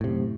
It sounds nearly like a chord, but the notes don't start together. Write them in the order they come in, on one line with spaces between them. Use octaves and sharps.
A2 C3 F#2